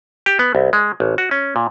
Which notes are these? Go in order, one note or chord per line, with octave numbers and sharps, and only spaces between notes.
G4
B3
C2
G#3
A1
F#4
C#4
A#2